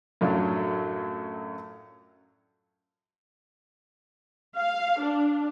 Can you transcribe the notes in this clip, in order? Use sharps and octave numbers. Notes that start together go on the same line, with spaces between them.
F#2 A2 F#3 D4 F4
F5
D4